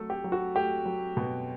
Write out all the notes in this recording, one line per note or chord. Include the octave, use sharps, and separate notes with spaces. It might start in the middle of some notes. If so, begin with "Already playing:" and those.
Already playing: F#3 A3 A4
G4
F#3
F#4
A3 G4
F#3
B2